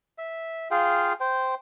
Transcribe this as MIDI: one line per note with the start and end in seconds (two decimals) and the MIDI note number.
0.18 0.68 76
0.71 1.13 65
0.71 1.13 68
0.71 1.13 77
0.71 1.13 79
1.20 1.55 72
1.20 1.55 79